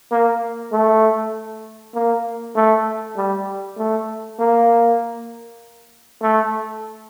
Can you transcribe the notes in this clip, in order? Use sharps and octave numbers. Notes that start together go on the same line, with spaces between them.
A#3
A3
A#3
A3
G3
A3
A#3
A3